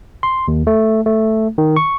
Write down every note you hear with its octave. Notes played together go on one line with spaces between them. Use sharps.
C6
D#2
A3
A3
D#3
C#6